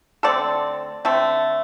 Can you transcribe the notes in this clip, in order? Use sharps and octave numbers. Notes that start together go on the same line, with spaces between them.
D3 A3 C4 A4 D5
D3 A3 C4